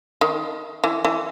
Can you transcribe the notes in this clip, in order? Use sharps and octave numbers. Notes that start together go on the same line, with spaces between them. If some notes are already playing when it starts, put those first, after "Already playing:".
D#3
E3
E3